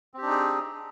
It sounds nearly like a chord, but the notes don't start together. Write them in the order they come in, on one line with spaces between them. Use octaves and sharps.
C4 G4 D4 D#4 G#4